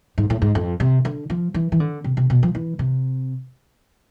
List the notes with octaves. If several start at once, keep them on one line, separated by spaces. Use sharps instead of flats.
G#2
A2
G#2
F2
C3
D3
F3
E3
E3
D3
C3
C3
B2
F3
E3
C3